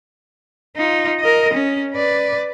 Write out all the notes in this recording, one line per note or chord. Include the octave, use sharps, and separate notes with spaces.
D#4 F4
A#4 D#5
C#4
B4 D5